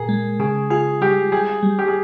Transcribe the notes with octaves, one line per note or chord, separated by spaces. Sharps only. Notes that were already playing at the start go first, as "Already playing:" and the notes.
Already playing: A#2 G#4 A#4
G#3
C#3 G#4
F4 G#4
G3 G4
G3 G#4
G3
G4
G#4